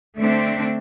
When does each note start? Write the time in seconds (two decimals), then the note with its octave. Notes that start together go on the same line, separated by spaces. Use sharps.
0.18 D3 A3 C4 D4